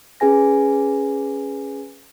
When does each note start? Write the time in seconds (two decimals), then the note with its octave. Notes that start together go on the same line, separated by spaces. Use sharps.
0.20 C#4 G#4 B4 G#5 A#6